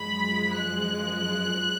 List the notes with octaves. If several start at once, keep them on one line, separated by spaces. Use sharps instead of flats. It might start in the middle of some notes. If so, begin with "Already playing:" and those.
Already playing: F#2 F3 G#3 B5
F#6